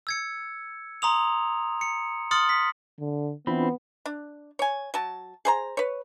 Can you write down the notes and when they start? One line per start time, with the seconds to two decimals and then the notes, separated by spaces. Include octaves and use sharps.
0.07 E6 G#6 C#7
1.02 A#5 C6 D#6 F7
1.81 C#7
2.31 C6 D#6 F6 A6 C#7 F#7
2.49 B6
2.99 D3
3.47 E3 B3 C4 D4 F4 B5
4.06 D4
4.59 C#5 G#5
4.94 F#3 A5
5.45 G#4 C5 A#5
5.77 B4 C#5